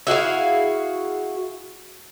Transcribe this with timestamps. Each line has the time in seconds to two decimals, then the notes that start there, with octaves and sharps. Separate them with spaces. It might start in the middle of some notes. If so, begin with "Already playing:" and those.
0.07 E4 F#4 G#4 F5